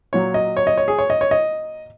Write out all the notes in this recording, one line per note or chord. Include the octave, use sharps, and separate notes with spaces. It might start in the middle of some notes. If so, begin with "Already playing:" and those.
A#2 F#3 C#5
D#5
C#5
D#5
C#5
G#4
C#5
D#5
C#5
D#5